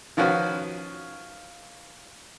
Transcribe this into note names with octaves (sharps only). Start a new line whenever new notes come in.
D#3 F3 C#4 F#4 B4